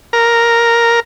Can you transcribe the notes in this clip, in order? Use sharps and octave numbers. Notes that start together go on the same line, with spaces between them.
A#4